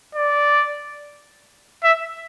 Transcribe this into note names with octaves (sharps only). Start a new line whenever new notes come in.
D5
E5